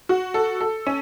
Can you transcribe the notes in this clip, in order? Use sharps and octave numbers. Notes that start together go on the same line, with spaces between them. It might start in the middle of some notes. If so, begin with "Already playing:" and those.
F#4
A4
A4
C#4